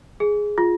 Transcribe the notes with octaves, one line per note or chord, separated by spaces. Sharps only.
G#4
F4